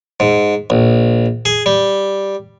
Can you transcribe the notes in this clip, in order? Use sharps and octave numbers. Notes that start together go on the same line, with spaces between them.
G#2
A#1
G#4
G3